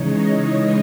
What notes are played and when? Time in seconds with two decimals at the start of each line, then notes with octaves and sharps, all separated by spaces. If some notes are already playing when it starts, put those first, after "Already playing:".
Already playing: C#3 E3 G#3 D#4 C#5
0.10 D#5